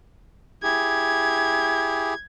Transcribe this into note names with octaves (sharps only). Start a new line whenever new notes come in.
E4 G4 G#4 G#6